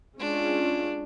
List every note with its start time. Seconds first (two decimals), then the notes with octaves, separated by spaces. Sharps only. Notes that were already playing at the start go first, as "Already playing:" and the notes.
0.18 G#3 C#4 D4 F4